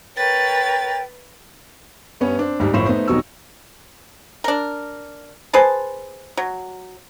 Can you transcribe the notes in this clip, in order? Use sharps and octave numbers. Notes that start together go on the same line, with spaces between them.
A#4 B4 C#5 G5 A6
G2 B3 C#4
C4 D4
D2 G#2 G3 D4
F#1 A2 F3 C5 C#6 E7
A3 B3 D#4 C5
F1 B2 F#3 D#4 C#6 E6
D4 A#4
G#4 B4 C5 A5
F#3